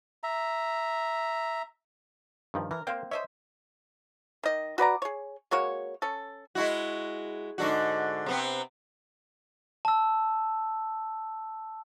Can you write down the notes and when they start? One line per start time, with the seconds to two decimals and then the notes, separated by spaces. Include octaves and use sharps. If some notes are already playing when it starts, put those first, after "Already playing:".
0.23 E5 A#5
2.54 G2 D#3 F3
2.71 E3 A#4
2.87 A#3 C4 C5 F5 G5
3.11 C5 C#5 D#5 E5
4.43 D#3 D#5
4.78 F#4 B4 D5 A#5
5.02 G#4 C#5
5.51 G#3 A#3 F#4 C#5
6.02 C#4 A4
6.55 G#3 E4 F#4
7.58 G#2 D3 F#4
8.26 C3 B3 C4
9.85 A5 E6